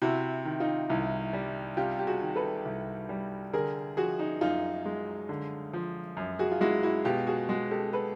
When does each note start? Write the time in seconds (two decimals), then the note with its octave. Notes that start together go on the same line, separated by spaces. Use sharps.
0.02 C3 E4 F#4
0.45 D#3
0.60 D#4 F4
0.90 C2 E4
1.33 G3
1.77 C3 F4 G4
1.99 G4
2.07 F#4 G#4
2.21 D#3
2.36 A4 B4
2.65 C2
3.09 G3
3.53 D3 G#4 A#4
3.97 F3 F#4 G#4
4.19 D#4
4.41 F#2 D#4 F4
4.86 G#3
5.29 D3
5.73 F3
6.17 F#2
6.39 F#4 G#4
6.51 F4
6.61 G#3 E4 F#4
6.83 E4 F#4
7.05 B2 F4 G4
7.27 F#4 G#4
7.49 G#3 F#4 G#4
7.71 G4 A4
7.93 A4 B4